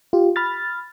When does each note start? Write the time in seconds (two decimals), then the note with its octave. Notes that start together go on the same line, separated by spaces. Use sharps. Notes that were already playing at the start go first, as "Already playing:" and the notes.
0.13 F4 G4
0.36 B5 F6 A6